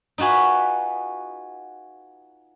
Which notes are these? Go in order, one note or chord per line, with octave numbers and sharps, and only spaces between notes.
D#4 F4 F#4 G#4 B4